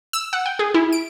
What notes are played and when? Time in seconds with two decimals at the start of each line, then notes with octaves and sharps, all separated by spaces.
0.13 E6
0.33 F#5
0.46 G5
0.59 G#4
0.74 E4
0.92 D7